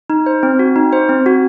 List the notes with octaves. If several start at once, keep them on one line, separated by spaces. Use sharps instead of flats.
D#4
C5
C4
F#4
D#4
C5
C4
F#4